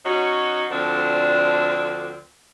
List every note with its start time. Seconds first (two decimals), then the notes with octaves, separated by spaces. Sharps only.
0.05 F#3 C#4 D#4 F#4
0.70 D2 D3 F3 C4 D4